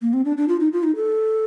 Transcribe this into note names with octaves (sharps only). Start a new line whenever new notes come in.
A#3
C4
D4
D4
F4
D#4
F4
D#4
A4